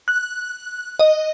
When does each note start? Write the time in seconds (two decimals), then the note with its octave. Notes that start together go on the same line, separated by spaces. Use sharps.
0.08 F#6
0.99 D#5